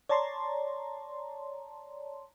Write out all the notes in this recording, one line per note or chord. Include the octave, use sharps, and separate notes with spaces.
C#5 D5 A5 A#5 C6